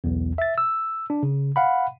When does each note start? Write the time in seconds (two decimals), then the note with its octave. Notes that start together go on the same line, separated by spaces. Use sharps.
0.04 B1 E2
0.38 E5 A6
0.58 E6
1.10 D4
1.23 C#3
1.56 F5 F#5 B5